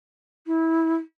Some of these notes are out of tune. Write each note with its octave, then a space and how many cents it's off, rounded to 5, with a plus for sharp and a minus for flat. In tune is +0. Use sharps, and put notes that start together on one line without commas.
E4 -20